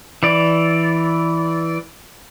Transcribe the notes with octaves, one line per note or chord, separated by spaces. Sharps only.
E3 D5